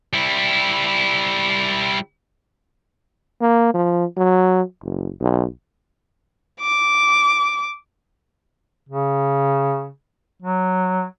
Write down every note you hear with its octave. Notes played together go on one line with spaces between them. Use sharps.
G3 E4
A#3
F3
F#3
F#1
B1
D6
C#3
F#3